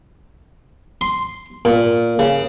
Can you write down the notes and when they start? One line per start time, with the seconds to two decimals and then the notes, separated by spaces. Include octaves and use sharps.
1.01 C6
1.65 A#2
2.19 C#3